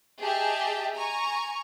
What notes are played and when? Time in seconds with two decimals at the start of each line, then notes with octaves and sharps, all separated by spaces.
0.20 G4 G#4 D#5 E5 G5 A5
0.93 G#5 A#5 C#6